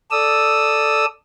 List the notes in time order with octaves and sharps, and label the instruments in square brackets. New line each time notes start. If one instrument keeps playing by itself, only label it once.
[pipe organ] A4 D5 D#6 E6